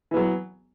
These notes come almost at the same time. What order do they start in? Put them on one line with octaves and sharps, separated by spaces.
E3 B3 F#3